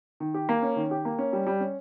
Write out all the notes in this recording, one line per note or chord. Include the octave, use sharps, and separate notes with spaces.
D#3
G4
A#3
C#4
D#3
G4
A#3
C#4
G3
G3
C#4